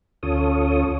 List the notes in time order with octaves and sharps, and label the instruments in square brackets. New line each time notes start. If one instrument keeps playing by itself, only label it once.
[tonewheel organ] D2 C#4 F4 A4 C#5 D#6